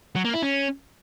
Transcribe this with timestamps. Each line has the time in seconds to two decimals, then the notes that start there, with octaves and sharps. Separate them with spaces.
0.16 F#3
0.25 A#3
0.34 E4
0.43 C#4